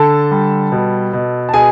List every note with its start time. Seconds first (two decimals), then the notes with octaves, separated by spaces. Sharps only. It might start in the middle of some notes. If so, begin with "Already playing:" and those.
Already playing: D3 A4 A5
0.31 G3
0.72 B2
1.13 B2
1.49 A5
1.54 B2 G#4 G#5